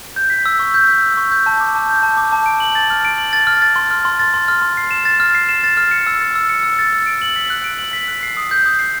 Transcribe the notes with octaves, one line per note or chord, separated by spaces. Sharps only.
G6
B6
E6
C#6
G6
B6
E6
C#6
G6
A5
D6
A5
G6
A5
D6
A5
D7
F#7
A6
F6
D7
F#7
A6
F6
A6
C6
F6
C6
A6
C6
F6
C6
C7
E7
A6
F6
C7
E7
A6
F6
C#7
E6
A6
E6
C#7
E6
A6
E6
D7
F#7
B6
F#6
D7
F#7
B6
F#6
C7
D#6
G6
D#6
C7